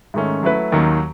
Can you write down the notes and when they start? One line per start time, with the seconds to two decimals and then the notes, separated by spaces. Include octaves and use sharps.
0.14 G#2 D#3 A3 C#4
0.43 F#3 A3 E4 B4
0.72 D#2 D#3 F#3